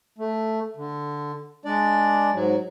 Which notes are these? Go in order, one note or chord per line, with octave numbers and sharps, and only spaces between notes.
A3
D3
G#3 D4 D5
G#2 F#3